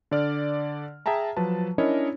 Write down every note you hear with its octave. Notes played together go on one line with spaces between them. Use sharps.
D3 D5 F6
G#4 E5 G5 A5 A#5
F3 F#3 B4 A5
C#4 D4 E4 A#4 C#5 D#5